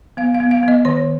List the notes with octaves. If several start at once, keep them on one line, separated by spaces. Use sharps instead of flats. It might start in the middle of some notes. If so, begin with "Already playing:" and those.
B3 F5
F5
B3
F5
B3 D#5
D#3 C#5